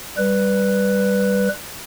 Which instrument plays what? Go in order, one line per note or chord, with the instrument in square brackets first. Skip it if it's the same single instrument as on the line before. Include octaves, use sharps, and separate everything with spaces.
[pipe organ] G3 B4